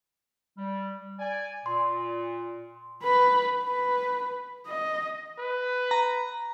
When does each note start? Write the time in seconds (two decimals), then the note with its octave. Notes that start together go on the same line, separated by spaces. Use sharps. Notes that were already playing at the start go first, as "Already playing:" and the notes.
0.58 G3
1.19 D5 G#5
1.66 A#2 C6
3.03 B4 B5
3.57 B4
4.68 D#5
5.39 B4
5.91 A#5